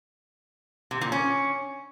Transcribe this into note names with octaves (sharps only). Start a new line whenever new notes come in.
C3
A#2
C#4